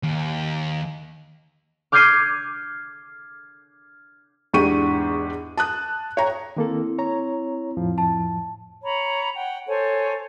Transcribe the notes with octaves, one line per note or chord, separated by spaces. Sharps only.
D#2
D6 F6 G6 G#6 C7 D#7
E2 G#2 D4 G4 C#6 D#7
A5 D#6 F#6
C#5 G5 A#5
D#3 A#3 C4 E4 A4
C#5 A#5
F2 A2 F3
A5
C#5 A#5 B5
F#5 G5
A4 C5 C#5 G#5